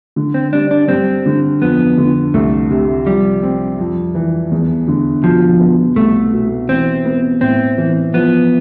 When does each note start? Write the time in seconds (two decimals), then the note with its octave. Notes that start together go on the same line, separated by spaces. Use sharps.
0.16 D3
0.34 C4
0.53 G3 D4
0.71 D4
0.89 G2 C4
1.26 D3
1.62 F2 B3
1.97 D3
2.34 C2 A3
2.71 C3
3.07 F3 G3
3.43 C4
3.79 F2
4.15 E3
4.52 E2
4.88 D3
5.24 B2 F3
5.60 B3
5.96 C2 A3
6.33 B2
6.68 E3 C4
7.05 B3
7.41 A2 C4
7.78 E3
8.14 F3 B3